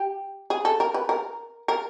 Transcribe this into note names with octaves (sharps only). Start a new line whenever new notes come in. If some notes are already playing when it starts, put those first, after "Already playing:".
Already playing: G4
G#4
A4
A#4
B4
A#4
A#4